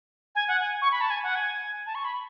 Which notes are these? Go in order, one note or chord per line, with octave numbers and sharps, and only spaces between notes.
G#5
F#5
G#5
C#6
B5
A5
G#5
F#5
G#5
A5
C#6
B5